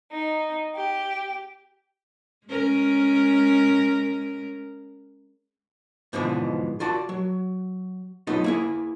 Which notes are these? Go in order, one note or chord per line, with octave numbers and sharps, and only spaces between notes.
D#4
G4
G#3 C#4 A#4
G#2 B2 D3 E3 F3 G#3
F4 F#4 D5 A5
F#3
F#3 A3 B3 D#4 F4
A#3 E4 G#4